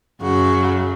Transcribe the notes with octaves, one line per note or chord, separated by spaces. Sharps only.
F#2 C#3 F#3 F#4